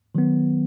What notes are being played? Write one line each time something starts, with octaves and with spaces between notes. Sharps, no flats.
D#3 F#3 B3